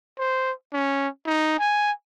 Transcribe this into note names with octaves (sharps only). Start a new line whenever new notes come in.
C5
C#4
D#4
G#5